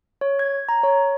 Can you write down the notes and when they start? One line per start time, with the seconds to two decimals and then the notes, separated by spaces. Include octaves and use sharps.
0.21 C#5
0.39 G#6
0.69 A#5
0.83 C#5